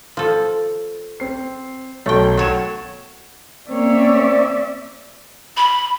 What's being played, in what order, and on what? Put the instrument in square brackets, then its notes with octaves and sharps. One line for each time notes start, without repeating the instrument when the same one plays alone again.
[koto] F3 A4
[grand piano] C4 C7
[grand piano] B1 [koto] A3 G5
[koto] F#3 C#5 [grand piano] A6 E7
[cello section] A#3 C#4 C#5 [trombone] C4 [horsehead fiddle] D5 E5
[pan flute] B5